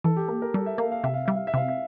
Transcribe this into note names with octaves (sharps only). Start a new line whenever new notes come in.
E3 A4
G4
A#3 A4
A#4
G3 A4
E5
A#3 F5
F5
C3 E5
F5
G3 E5
F5
E5
C3 F5
E5